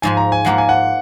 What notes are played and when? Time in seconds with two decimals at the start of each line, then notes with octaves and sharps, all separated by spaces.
0.02 G#2 F3 G#3 G#5
0.17 A#5
0.32 G#5
0.45 G#2 F3 A#3 F4 A#4 F#5
0.58 G#5
0.69 F#5